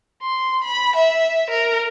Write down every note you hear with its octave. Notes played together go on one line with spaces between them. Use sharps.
C6
B5
E5
A#4